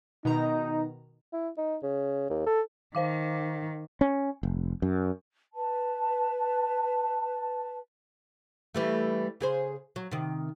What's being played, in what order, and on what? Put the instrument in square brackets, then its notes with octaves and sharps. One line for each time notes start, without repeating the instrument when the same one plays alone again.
[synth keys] B2 D#3 A#5 [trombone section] D#4
[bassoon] E4
D#4
C#3
D#2
A4
[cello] D#3 [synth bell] C5 F5 D6
[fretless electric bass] C#4
F1
F#2
[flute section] B4 A5
[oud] E3 G3 A3
C#3 G#4 C5
F#3
C3 D#3